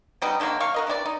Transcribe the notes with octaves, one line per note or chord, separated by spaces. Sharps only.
F#3 G3 B3 D#4
D3 D#3 F#3 A#3
A#3 F5 C#6
F#4 A#4 D#5
C3 E3 E4 D5
D#4